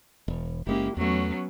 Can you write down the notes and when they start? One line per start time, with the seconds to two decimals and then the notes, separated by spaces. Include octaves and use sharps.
0.28 E1
0.67 F#1 G#3 A#3 C#4 E4 G4
0.97 E2 F#3 A3 B3 C#4